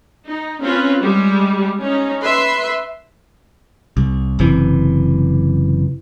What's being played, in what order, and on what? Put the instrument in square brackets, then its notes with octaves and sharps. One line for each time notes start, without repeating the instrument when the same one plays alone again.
[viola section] D#4
C4 C#4 F4 B4
G3 G#3 G4
C#4 D#4
B4 E5 C6
[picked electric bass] C2
F#1 C3 E3